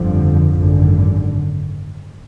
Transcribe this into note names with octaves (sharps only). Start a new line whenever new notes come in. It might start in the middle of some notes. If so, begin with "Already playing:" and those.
Already playing: G1 F2 D3 F3
G#1 F#2 D3